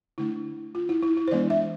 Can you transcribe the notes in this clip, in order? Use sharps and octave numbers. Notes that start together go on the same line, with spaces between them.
D3 A3 D4 E4
F4
E4
E4
E4
C5
E3 G#3 B3 D4 D5
E5